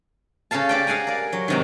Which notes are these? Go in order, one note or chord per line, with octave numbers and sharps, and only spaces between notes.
C#3 C#4 A4 F5 A5
G4 D5 G5
G#4 F5 F#5 G#5 A#5
A#4 D5
F#3
G#2 C3 D#3